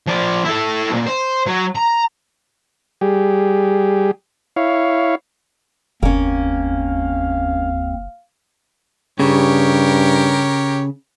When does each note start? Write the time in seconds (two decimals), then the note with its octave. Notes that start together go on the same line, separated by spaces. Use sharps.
0.07 F3 D5
0.44 E4 A4
0.90 B1 A#2
1.06 C5
1.47 F#3
1.76 A#5
3.01 G3 G4 G#4
4.56 E4 C#5 F5
6.03 F#1 D#2 A#3 C4 C#4 F5
9.20 G2 C#3 G4 A#4 C#5